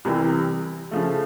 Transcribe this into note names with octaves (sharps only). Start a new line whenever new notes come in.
C2 C3 E3
C#3 F3 A3